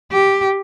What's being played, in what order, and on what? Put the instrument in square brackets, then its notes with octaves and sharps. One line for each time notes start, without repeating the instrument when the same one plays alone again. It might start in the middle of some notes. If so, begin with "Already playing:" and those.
[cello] G4